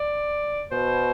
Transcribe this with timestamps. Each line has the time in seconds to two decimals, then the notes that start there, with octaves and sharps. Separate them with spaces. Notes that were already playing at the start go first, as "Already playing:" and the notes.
Already playing: D5
0.72 B2 C5